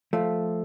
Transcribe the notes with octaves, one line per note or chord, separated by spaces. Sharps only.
F3 A3